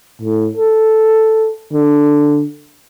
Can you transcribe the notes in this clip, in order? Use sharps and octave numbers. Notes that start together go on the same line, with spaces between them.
A2
A4
D3